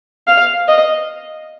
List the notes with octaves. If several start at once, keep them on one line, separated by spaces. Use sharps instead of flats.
F5
D#5